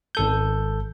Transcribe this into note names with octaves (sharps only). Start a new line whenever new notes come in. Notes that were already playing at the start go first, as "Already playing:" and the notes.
G#1 A4 G6